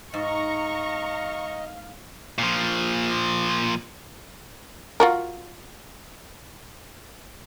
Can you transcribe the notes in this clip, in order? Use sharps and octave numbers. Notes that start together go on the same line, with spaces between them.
G#2 D#5 F5 A#5 C#6
A#2 F3
F4 F#4 A#4